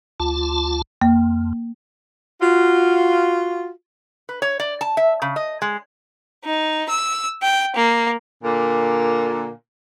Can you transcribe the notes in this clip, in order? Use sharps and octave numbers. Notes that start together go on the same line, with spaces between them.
D2 F4 A5
F2 A#3
F4 F#4
B4
C#5
D5
A5
E5
C#3
D#5
G#3
D#4
E6
G5
A#3
A#2 D3 A#3